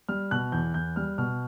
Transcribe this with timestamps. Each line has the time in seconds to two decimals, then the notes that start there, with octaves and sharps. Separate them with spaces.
0.09 G3 F6
0.31 B2 F#6
0.52 E2 G6
0.74 E2 G6
0.96 G3 F6
1.18 B2 F6